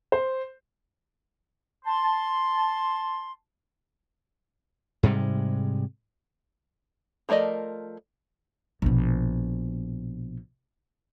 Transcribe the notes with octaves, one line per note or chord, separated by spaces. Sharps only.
C5
A5 C6
G#2 C3 G3 G#3
F3 A3 A#4 D5 D#5
A#1 B2